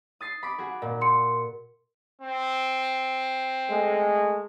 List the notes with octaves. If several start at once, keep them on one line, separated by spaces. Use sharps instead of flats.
D#6 A6 C7
B5 D6 B6
F#4 G#4
A#2
C6 C#7
C4
G#3 A3